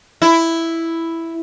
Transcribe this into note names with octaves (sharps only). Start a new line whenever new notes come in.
E4